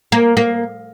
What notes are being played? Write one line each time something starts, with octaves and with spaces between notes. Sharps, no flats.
A#3
A#3